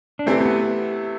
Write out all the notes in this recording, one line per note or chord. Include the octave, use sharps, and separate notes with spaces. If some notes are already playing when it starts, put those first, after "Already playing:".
D4
C3 E3 A3 C4
C4
B3